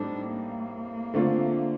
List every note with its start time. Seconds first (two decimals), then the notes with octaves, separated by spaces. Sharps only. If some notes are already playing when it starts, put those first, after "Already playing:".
Already playing: A2 G3 C4 D4 D#4
0.30 A#3
1.14 D3 A3 C4 F4